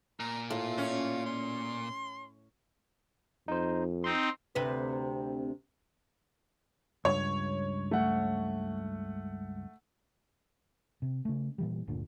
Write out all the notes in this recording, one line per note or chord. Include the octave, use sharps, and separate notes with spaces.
A#2 A#5
A2 F4
C#4
C6
F2 D#4 C5
C4 D#4 C6 C7
D2 C3 B4
C#2 G2 C#5
A3 F#5
C3
C#3 A3
A#2 E3 G3
G1 D2 A#2 D3